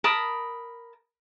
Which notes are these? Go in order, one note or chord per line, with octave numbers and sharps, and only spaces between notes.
A#4 A5 B5 D#6